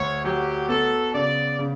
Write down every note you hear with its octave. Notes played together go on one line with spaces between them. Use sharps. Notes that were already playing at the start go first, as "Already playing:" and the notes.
Already playing: D2 C#5
F#3 G4
B3 A4
C#3 D5
C#3